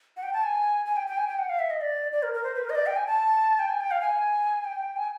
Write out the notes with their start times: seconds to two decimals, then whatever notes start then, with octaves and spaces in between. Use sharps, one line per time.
0.17 F#5
0.23 G5
0.33 A5
0.44 G#5
0.86 G#5
0.96 G5
1.07 G5
1.17 G#5
1.28 G5
1.39 F#5
1.49 F5
1.59 E5
1.70 D#5
1.81 D5
2.12 D5
2.23 A#4
2.33 A#4
2.44 C5
2.55 B4
2.65 A#4
2.70 D#5
2.75 D5
2.86 G5
2.96 G#5
3.07 A5
3.59 G5
3.69 G#5
3.80 G5
3.91 F5
4.01 G#5
4.65 G5
4.96 G#5